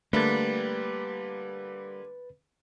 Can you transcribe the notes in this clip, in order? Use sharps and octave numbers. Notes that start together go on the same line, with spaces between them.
D3 G3 A3 A#3 B4 A6